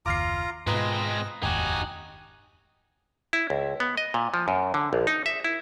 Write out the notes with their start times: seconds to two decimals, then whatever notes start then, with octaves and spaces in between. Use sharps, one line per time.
0.06 F#1 D#2 F4 A#5 D6 F6 C7
0.67 G#2 B2 G#3 C4 F4 B4 D#5 A#5
1.43 F1 D#2 G#2 D#4 F#4 G4 G#5
3.33 E4
3.50 C#2
3.80 B3
3.97 D#5
4.14 A#2
4.34 F3
4.48 F#2
4.74 D3
4.93 A#1
5.07 D#4
5.26 E5
5.44 E4